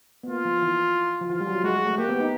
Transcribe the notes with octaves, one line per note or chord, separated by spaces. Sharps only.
B3
A#3 F4
F3
E3
F3
E3 F4
G3
F#3
G#3 F#4
G#3
A3
A#3 G4
B3
D#4